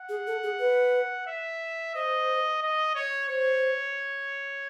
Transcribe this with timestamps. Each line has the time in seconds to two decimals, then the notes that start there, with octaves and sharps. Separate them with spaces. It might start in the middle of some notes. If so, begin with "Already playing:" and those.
Already playing: F#5
0.09 G#4
0.27 A4
0.43 G#4
0.59 B4
1.27 E5
1.95 C5 D#5
2.62 D#5
2.95 C#5
3.29 C5 C#5